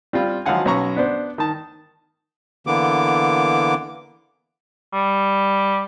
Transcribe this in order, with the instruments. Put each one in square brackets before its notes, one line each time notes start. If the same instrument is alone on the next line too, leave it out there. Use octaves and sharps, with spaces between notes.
[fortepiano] G3 C4 F4 B5 F6
G#1 F3 F#3 F5 F#5 G#5
B1 C#4 F#5 A#5 C#6
B3 D4 C5
D#3 A5
[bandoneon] D3 E3 A#3 B3 D6
[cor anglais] G3